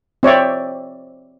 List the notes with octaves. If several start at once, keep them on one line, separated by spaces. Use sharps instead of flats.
C4 C#5 D5 E5